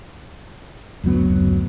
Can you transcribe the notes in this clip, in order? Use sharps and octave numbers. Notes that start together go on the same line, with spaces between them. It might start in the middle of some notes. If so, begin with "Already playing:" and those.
F#1 D2 F#3 B3